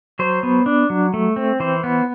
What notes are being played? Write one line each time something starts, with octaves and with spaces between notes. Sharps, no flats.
F#3 C5
B3
D4
F#3
A3
C4
E3 C5
B3